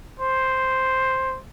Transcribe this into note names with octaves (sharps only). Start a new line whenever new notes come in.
C5